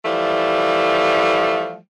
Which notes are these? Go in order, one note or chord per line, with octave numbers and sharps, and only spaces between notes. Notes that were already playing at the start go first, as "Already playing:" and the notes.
E3 F3 G3 A3